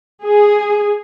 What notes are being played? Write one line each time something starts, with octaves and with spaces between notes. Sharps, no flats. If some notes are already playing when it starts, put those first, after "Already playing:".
G#4